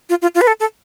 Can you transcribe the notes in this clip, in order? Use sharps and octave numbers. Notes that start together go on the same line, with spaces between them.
F4
F4
F4
B4
A4
A4